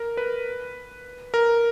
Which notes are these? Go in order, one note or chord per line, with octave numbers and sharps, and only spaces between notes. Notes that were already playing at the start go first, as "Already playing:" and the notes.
Already playing: A#4
B4
A#4